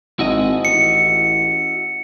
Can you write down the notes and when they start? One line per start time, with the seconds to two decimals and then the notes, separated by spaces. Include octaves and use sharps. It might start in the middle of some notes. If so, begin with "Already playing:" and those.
0.19 G#1 E4 F#4 D#5
0.65 A1 C#7